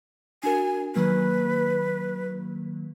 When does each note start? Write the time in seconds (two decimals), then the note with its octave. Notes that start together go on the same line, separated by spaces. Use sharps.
0.44 D4 F#4 A#4 G#5
0.96 D#3 F#3 A#3 B4